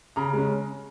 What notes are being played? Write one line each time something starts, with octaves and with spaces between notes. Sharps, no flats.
C#3 A#5
G#3 C#4